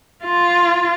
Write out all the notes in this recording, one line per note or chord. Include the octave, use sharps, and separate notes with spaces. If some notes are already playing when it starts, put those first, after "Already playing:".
F4